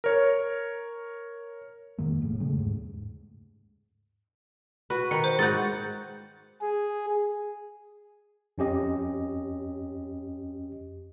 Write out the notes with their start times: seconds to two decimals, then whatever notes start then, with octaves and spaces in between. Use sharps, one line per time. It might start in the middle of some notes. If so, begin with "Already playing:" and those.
0.04 A#4 C#5
1.98 F2 D#3 G#3 A#3
2.21 F1 A2
2.40 E1 C#3 G#3 A3
2.59 D#2 G#2
4.90 F#4 B4
5.11 D#3 B4 C#7
5.24 C5
5.39 G#2 F#4 F#5 G6 A6
6.61 G#4
8.58 F2 C#4 G4 D#5